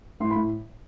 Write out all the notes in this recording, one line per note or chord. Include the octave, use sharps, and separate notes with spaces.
A2 C6
B5
A2